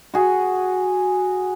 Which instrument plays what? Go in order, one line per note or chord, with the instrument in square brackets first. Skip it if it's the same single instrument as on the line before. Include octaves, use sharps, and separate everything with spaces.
[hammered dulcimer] F#4 G#4